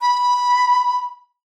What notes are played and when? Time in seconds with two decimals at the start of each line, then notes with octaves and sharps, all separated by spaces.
0.01 B5